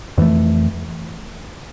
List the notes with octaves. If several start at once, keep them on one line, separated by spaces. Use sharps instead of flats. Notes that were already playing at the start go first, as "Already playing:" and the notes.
F2 E3 A3